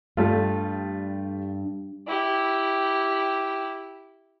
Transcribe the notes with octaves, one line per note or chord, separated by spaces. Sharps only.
G2 G3 A3 F4
E4 G4